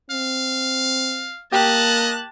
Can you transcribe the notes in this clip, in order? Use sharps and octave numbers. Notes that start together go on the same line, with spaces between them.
C4 F5
A#3 G4 D#5 A5 F#6